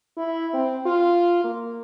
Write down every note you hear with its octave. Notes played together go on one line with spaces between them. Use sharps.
E4
C4
F4
A#3